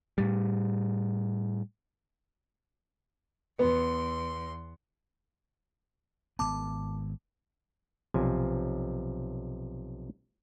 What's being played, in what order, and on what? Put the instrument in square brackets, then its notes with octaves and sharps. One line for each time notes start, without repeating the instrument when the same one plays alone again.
[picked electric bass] A2 G3
[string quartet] E2 C6 [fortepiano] B3
[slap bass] G#1 E2 B3 [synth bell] A5 D6
[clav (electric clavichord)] B1 C3 F3 G#5